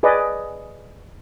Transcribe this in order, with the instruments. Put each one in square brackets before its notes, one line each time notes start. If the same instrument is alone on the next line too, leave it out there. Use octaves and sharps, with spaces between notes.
[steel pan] G#4 B4 D5 D#5